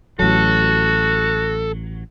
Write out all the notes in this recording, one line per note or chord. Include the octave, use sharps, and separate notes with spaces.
A1 F#3 F#4 A4